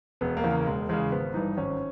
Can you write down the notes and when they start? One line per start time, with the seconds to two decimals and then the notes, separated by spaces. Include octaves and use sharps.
0.21 E1 B3
0.37 A#3
0.44 E2 C#3
0.51 A#3
0.66 E1 G#3
0.89 E2 C#3 G#3
1.12 G#1 B3
1.34 G2 E3 D#4
1.57 G#1 C#4